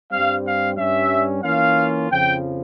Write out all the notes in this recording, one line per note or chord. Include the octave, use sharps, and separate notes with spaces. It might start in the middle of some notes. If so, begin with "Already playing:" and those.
G2 G3 C4 F5
F5
G2 G3 C#4 E5
E3 A#3 C#4 F4 F5
F2 C#3 F3 G5